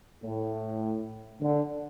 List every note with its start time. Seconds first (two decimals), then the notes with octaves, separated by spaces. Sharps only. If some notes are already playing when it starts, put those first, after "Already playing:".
0.24 A2
1.41 D3